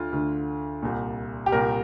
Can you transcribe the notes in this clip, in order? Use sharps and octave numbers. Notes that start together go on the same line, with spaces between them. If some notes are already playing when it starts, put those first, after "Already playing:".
Already playing: D2 D3 F4
D2 D3
C2 A#2
G4
C2 A#2 A#4